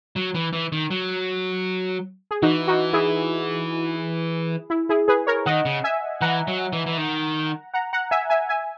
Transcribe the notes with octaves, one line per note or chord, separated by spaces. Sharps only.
F#3
E3
E3
D#3
F#3
G#4
E3 D#4 F#4
D#4 F#4
E4 G#4
E4
E4 G#4
G#4 B4
A#4 C#5
D#3 D#5 F#5
C#3
E5 G#5
E3 F#5 A#5
F#3
E3
E3
D#3
F#5 A#5
F#5 A#5
E5 G#5
E5 G#5
E5 G#5